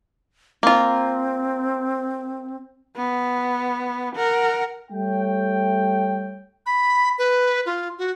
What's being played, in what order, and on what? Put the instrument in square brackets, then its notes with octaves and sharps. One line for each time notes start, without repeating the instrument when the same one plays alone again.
[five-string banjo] A#3 F4 [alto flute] C4
[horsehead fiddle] B3
A#4 F#5
[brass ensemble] G3 A3 C#5 G5
[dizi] B5
B4
F4
F#4